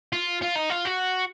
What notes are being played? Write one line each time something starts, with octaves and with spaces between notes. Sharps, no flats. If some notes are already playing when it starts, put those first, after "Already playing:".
F4
F4
D#4
F4
F#4